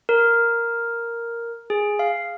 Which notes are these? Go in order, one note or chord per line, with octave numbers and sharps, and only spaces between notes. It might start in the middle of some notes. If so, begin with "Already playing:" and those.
A#4
G#4
F5